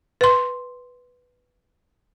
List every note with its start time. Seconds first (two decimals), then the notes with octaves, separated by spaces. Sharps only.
0.21 B4 C6